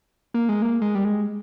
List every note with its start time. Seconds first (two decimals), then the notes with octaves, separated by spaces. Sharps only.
0.34 A#3
0.49 G#3
0.62 A#3
0.82 G#3
0.95 G3
1.04 G#3